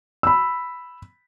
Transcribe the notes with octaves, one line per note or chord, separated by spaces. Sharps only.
B5 E6